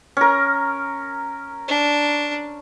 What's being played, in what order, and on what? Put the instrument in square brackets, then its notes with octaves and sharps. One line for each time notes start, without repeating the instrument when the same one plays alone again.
[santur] C#4 A#4
[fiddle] D4